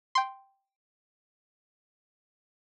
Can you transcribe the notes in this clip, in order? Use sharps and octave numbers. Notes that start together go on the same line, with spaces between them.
G5 C6